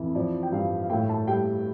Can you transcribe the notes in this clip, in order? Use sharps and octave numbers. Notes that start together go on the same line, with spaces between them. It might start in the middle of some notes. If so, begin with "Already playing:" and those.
Already playing: F2 E3
F3 D5
G5
G2 F5
F5
A2 G5
A5
G3 G5